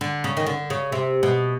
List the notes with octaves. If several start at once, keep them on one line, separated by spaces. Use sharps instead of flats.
D3
C#3
D#3
D3
C#3
C3
B2